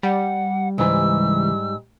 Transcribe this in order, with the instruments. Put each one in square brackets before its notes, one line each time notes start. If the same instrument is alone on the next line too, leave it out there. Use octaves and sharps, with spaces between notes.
[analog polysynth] G3 [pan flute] F#5
[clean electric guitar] C#2 E3 [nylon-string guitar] G#2 [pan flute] E6